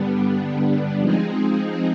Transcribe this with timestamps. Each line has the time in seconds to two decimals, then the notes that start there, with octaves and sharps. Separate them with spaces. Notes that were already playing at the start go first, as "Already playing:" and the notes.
Already playing: G2 D3 G3 B3 D4
1.00 F3 G#3 C4 D#4 G#4